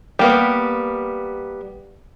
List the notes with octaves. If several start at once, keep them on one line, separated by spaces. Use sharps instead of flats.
G3 A#3 B3